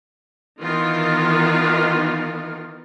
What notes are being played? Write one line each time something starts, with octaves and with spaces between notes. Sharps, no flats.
D#3 E3 B3 D#4 F4